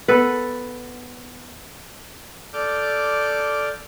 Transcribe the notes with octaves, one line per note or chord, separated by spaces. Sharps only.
B3 A4 B4
A4 D5 D6 F6 G6